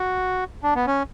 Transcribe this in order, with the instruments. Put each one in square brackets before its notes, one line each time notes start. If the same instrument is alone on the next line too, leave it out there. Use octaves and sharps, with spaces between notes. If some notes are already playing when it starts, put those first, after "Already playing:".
Already playing: [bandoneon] F#4
D4
B3
C#4